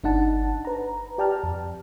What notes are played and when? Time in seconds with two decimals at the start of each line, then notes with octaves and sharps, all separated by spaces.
0.04 G1 D4 D#4 F#5 A5
0.65 B4 A#5
1.18 G4 D5 G5 A5 A#5 F6
1.43 F2